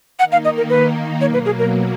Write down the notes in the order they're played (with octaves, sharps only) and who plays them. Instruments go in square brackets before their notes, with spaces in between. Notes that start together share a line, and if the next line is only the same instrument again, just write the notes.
[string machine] D#3 A#3 D#4 [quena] F#5
[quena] F5
D#5
A#4
B4
[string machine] B2 F#3 A#3 [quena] C#5
[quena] B4
G#4
A#4